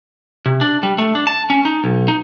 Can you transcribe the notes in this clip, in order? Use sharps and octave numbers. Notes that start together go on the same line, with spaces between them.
C3
D4
G3
A3
D4
A5
C#4
D#4
B1
D#4